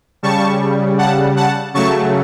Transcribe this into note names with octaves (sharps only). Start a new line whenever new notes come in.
C#3 G3 A5 C#6
F#5 A5
F#5 A5
C#3 F#3 A3 A5 C#6